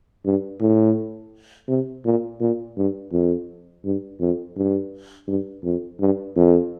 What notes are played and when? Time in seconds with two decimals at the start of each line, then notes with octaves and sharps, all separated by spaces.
0.25 G2
0.61 A2
1.69 C3
2.05 A#2
2.40 A#2
2.77 G2
3.12 F2
3.85 G2
4.20 F2
4.56 G2
5.28 G2
5.64 F2
6.00 G2
6.36 F2